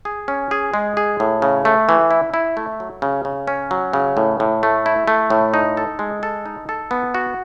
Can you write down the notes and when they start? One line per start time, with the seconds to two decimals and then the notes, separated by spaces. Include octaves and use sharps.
0.05 G#4
0.28 C#4
0.51 G#4
0.74 G#3
0.97 G#4
1.20 A2
1.42 C#3
1.65 A3
1.89 E3
2.11 E4
2.34 E4
2.57 A3
2.80 F#3
3.02 C#3
3.25 C#3
3.47 C#4
3.71 F#3
3.93 C#3
4.17 A2
4.40 A2
4.63 A3
4.86 E4
5.08 A3
5.30 A2
5.54 D#4
5.77 A4
5.99 G#3
6.23 A4
6.46 D#4
6.69 A4
6.91 B3
7.14 F#4